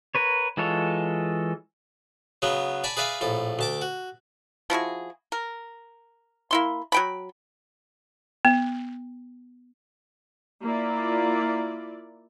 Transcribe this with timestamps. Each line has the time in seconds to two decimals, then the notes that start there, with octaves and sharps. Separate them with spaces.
0.15 A#4 B4 C#5
0.57 E3 G#3 F4 A4 C#5
2.42 C#3 F#3 B3 C#5
2.84 D5 G#5 A5 B5
2.97 G#4 B4 D5 E5 F5 G#5
3.21 A#1 A2 A4
3.59 D2 A5 D6
3.82 F#4
4.70 F3 E4 F#4 G#4
5.32 A#4
6.51 A#3 E4 C6
6.92 F#3 G5 B5
8.45 B3
10.62 A#3 E4 F4 D5